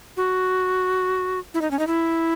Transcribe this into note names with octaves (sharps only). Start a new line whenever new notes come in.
F#4
E4
D#4
C#4
D#4
E4